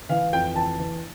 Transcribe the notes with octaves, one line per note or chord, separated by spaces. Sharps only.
E3 F5
F2 G5
E3 A5
E3